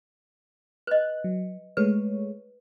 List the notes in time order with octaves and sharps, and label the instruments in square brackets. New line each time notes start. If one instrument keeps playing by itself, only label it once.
[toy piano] B4 D#5 [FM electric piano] F#6
[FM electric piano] F#3
[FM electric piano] G#3 A3 C#5 [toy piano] B4